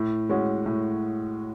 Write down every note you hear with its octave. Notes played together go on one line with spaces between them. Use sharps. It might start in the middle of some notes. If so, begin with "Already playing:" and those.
Already playing: A2
G#3 C#4 F#4
A2